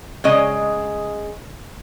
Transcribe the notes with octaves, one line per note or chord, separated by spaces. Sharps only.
C#3 G#3 D#5